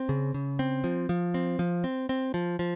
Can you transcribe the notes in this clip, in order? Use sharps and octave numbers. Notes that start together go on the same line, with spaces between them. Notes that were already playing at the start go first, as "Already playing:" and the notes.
Already playing: C4
C#3
C#3
C4
F3
F3
C4
F3
C4
C4
F3
F3